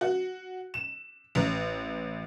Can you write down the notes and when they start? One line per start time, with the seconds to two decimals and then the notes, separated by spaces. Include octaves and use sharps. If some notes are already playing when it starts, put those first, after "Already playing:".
0.01 F#4
0.74 E7
1.35 A1